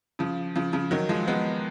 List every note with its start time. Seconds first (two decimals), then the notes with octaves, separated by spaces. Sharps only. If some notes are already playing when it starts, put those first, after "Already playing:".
0.19 C#3 F3
0.56 C#3 F3
0.73 C#3 F3
0.91 D#3 F#3
1.09 F3 G#3
1.27 G#3 B3